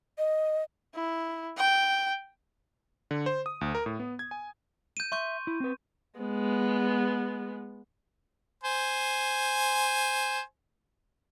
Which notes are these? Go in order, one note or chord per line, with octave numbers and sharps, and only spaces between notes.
D#5
E4
G5
D3
C5
D#6
D2
A#4
A2
B3
G#6
G#5
G6 D#7
E5 C6 C#6 G6
E4
C4 B4
G#3 B3
C5 G#5